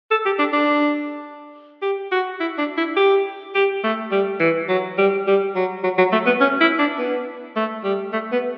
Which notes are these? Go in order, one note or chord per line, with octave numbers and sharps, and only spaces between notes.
A4
G4
D4
D4
G4
F#4
E4
D4
E4
G4
G4
A3
G3
E3
F#3
G3
G3
F#3
F#3
F#3
A3
B3
C#4
E4
D4
B3
A3
G3
A3
B3